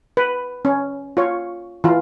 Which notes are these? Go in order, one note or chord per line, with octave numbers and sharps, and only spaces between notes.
B4
C#4
F4 C#5
E3 F4